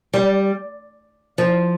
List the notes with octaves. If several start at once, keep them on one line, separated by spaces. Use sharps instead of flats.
G3
F3